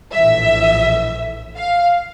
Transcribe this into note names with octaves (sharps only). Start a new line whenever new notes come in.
A#1 A2 E3 E5
F5